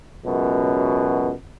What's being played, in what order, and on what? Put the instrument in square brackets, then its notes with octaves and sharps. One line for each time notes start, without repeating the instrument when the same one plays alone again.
[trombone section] C#2 F#2 B2